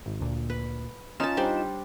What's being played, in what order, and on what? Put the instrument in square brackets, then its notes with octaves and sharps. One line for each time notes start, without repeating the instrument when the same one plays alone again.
[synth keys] G#1
D2 A#2
[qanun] B4
[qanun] C#4 A5 [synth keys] D#4 F4 E7
[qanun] G3 D4 C5